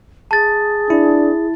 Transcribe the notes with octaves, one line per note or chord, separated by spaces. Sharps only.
G#4 A5 A6
D4 E4